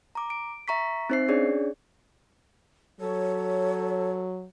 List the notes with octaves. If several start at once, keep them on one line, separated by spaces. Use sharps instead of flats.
A#5 D6
D7
E5 A#5 C#6 B6
C4 D#4 C5 E5 C7
C#4 D4 G#4 C#5 D5
F#3 A4 C#5